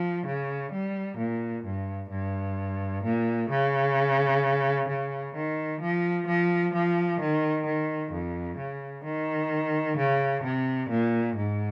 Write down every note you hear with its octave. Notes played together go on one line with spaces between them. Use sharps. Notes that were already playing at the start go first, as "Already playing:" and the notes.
Already playing: F3
C#3
G3
A#2
G2
G2
A#2
C#3
C#3
D#3
F3
F3
F3
D#3
D#3
F2
C#3
D#3
C#3
C3
A#2
G#2